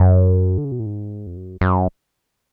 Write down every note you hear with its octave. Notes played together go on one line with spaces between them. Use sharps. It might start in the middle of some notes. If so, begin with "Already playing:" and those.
Already playing: F#2
D3
C#3
B2
A2
G#2
F2
F#2
F#2